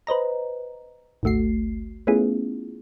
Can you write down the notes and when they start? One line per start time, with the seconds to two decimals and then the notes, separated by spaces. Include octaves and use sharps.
0.07 B4 C5 D#5 A#5
1.23 G#1 D2 A3 F#4 C7
2.07 A3 B3 C#4 E4 F4 G#4